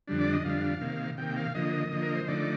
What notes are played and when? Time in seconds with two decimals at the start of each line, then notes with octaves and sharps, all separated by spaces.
0.07 F2 D3 G3 D4
0.21 D5
0.33 D#5
0.45 F2 D3 G3 D4 F5
0.81 C3 D#3 A#3
1.18 C3 D#3 A#3 G5
1.36 F5
1.55 D3 F3 A#3 D#5
1.91 D3 F3 A#3
2.02 A#4
2.15 C5
2.28 D3 F3 A3 D#4 D5